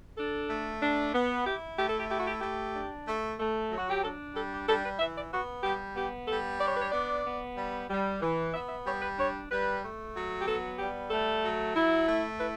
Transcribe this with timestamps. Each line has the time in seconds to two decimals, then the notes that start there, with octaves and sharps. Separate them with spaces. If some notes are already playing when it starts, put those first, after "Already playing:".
0.17 D4 A4
0.48 A3
0.81 D4
1.14 B3
1.45 E4 G4
1.77 A3 G4
1.88 A4
1.97 G4
2.09 E4 G4
2.18 F#4
2.26 G4
2.41 A3 G4
2.74 D4
3.07 A3
3.38 A3
3.71 F#3
3.77 F#4
3.90 G4
4.02 D4 A4
4.34 G3 A4
4.51 G4
4.68 G3 A4
4.83 B4
4.99 E3 E5
5.15 D5
5.31 B3 F#4
5.63 G3 G4
5.95 B3 G4
6.28 G3 A4
6.60 D4 D5
6.68 C#5
6.75 B4
6.81 C#5
6.92 B3 D5
7.25 B3
7.56 G3
7.89 G3
8.21 E3
8.54 B3 E5
8.69 E5
8.86 G3 C#5
9.01 B4
9.17 D4 C#5
9.50 G3 B4
9.82 A3
10.13 F#3
10.41 G4
10.46 B3 A4
10.79 G3 G4
11.10 A3 A4
11.43 F#3
11.76 E4
12.07 A3
12.39 E4 B4